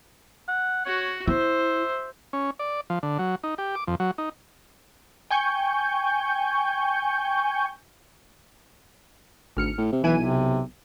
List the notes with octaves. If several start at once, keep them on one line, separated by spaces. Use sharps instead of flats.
F#5
F#4 C#5 F#5
E4 C5 E5
C#4
D5
F3
D3
F#3
D#4
G4
D6
F2
F#3
D#4
G5 G#5 C#6 G6
G#1 D2 F6 C#7
A2
C3
B1 E3 E4 G#5 D#7
C3